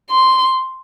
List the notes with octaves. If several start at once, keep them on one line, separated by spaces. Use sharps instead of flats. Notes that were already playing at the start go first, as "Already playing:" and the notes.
C6